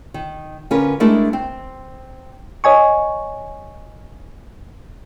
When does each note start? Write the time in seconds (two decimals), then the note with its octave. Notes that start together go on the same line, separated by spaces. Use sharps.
0.14 D#3
0.71 D3 C#4 F4 A#4 B4
1.00 G#3 A3 D4 E4 G#4 A#4
1.33 C4
2.64 C#5 D#5 G#5 C#6